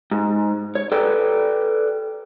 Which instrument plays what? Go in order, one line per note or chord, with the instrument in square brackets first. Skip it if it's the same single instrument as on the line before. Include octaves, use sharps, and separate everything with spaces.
[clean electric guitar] G#2
C#5
A4 B4 D5 G5